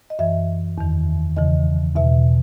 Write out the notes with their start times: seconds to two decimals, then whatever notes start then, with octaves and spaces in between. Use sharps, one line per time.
0.10 D#5
0.19 F#2 E3 E5
0.78 E2 D#3
1.36 E2 C#3 E3 D#5
1.95 E2 B2 E5